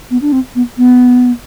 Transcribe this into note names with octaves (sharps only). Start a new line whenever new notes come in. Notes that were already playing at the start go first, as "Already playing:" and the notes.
B3
D4
C4
B3
B3